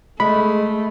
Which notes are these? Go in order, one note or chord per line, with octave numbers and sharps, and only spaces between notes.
G#3 A3 B5